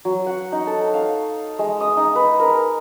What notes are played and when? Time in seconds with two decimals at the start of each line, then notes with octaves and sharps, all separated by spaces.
0.05 F#3
0.27 F#5
0.52 D#4
0.67 A4
0.94 F5
1.59 G#3
1.80 D#6
1.97 D#4
2.15 B4
2.40 A#4